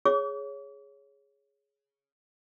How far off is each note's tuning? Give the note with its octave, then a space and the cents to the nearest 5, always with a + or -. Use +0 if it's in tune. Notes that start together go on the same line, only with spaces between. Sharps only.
G#4 +0 C#5 +0 D6 -45